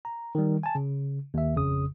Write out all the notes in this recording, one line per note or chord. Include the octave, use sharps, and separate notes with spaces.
A#5
D#3 G3
G#5 A5
C#3
D#2 E5
G#1 F2 C#3 D#6